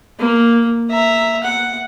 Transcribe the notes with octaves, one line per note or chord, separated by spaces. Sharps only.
A#3
E5 A#5
F#5